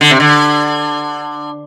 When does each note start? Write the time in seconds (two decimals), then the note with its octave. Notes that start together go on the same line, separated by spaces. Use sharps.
0.01 D3
0.11 C3
0.20 D3